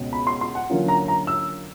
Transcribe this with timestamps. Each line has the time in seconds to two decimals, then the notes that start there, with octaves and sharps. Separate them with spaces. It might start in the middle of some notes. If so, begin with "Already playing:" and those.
Already playing: C#2 B2 C#4
0.13 B5
0.27 C6
0.41 C6
0.55 F#5
0.70 D3 F#3 A#3 C#4 F4
0.88 A#5
1.08 A#5
1.27 E6